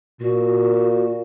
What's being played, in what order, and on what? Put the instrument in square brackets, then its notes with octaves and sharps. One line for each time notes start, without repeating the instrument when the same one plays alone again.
[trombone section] A#2 [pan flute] F#4